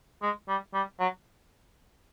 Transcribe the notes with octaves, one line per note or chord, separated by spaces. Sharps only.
G#3
G3
G3
F#3